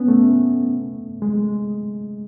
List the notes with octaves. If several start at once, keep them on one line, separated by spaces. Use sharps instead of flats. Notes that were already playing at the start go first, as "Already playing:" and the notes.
Already playing: B3 C#4
A3
G#3